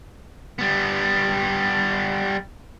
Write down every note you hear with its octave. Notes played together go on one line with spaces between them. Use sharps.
G3 B3